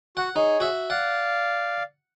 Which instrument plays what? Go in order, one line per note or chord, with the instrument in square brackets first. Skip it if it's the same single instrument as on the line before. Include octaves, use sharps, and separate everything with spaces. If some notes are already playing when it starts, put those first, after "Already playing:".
[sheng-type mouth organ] F#4 [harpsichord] F#5
[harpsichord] D#4 [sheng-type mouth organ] G#4 C#5
[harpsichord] F#4 E5
[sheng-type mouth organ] D5 F5 [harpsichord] F#5